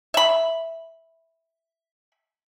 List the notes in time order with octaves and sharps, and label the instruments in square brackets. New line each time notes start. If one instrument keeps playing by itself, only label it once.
[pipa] E5 B5